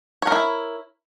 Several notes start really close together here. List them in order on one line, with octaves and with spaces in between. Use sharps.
C#5 A#4 E4